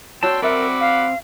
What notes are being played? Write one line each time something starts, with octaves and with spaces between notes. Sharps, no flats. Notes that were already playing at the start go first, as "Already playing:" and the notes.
F#4 C#5 D5 G5 A5 C6 E6
C4 F#4 A#4 D5 E5 F#5 B5 D6
F5